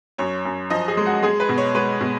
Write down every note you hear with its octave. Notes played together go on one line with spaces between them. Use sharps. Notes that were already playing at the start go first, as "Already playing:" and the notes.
F#2 C#5
F#2
F3 D#5
G#4
G#3
F#4
G#3 G#4
B4
B2
C#5
G#3 B4
B2